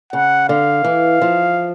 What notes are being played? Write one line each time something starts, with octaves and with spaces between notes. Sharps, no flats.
C#3 F#5
D3 F5
E3
F3